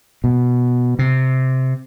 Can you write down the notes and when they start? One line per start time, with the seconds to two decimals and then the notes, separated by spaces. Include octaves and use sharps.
0.24 B2
0.99 C3